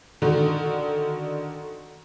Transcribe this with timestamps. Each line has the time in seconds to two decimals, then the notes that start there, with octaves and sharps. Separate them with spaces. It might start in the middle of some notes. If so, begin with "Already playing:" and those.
0.22 D3 D#3 F#4